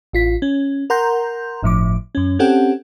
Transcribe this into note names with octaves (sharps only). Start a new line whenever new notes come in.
A1 F4 B6
C#4
A#4 F#5 A#5 C6 G6
G1 A2 F3 D6
F#2 C#4
C4 C#4 G4 A4 F#5